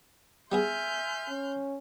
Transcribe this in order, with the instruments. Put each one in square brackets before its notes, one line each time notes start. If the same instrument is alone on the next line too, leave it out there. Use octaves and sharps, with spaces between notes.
[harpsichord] G3 B3 G#4 [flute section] E5 G#5 [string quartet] C6 F6 G6
[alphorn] C#4